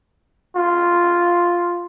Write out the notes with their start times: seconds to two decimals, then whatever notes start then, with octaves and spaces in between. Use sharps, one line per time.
0.55 F4